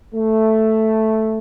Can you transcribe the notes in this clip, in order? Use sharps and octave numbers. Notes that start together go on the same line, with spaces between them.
A3